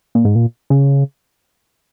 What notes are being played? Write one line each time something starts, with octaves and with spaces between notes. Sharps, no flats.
A#2
G#2
A#2
C#3